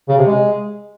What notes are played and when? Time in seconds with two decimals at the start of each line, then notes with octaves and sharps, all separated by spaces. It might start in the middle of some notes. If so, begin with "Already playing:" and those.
0.09 C#3
0.18 C3
0.27 G#3